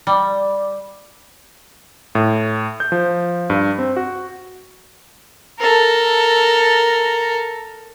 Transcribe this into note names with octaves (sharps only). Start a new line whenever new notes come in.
G3
A2
G6
F3
G2
C4
F#4
A4 A#4